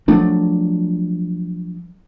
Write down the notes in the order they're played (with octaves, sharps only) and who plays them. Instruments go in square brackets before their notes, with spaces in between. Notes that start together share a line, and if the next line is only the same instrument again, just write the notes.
[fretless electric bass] F3 F#3 A3 D4